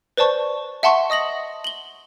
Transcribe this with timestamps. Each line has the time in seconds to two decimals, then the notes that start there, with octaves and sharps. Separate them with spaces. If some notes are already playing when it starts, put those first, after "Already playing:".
0.17 B4 C5 D5 A5 C#6
0.83 E5 F#5 A5 C6 C#6
1.10 D#5 D#6 A#6 F#7
1.64 F#7 G7